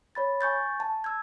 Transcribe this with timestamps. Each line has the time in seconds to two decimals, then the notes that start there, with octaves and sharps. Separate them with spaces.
0.15 C#5 B5 A6
0.41 G#5 C#6 G6 A6
0.80 A5
1.04 E6 G#6